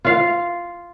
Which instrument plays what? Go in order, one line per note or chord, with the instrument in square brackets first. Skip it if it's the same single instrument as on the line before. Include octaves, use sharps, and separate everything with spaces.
[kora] F4 F5